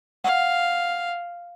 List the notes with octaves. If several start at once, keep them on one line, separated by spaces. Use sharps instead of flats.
F5 F#5